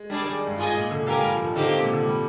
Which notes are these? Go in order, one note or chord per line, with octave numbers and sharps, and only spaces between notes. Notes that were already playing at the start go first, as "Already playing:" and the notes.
Already playing: G#3
G3 D4 G#4 D5
D#3
G2
G#2 F4 G#4 D#5 G#5
A#2
D3
D3 G4 A#4 F5 G#5
G3
F3
D#3
D3 A#3 D#4 G4 C5
C3
A#2
D3
G3